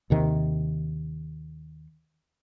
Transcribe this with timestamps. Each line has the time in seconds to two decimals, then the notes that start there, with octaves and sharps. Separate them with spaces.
0.10 D#2 C3 D#3